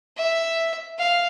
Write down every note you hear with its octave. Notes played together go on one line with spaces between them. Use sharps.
E5
F5